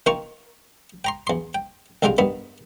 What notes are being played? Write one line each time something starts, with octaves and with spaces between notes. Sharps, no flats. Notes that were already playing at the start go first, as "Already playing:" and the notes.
D#3 A#3 F4 G5 C#6
G5 A#5 C6
E2 C6
G5
C2 D3 G3 G#3 F4 G5
G2 D#3 B3 B5